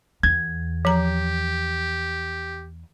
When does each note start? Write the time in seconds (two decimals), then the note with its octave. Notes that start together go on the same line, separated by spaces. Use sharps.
0.23 E2 G#6
0.85 F3 G4 A#5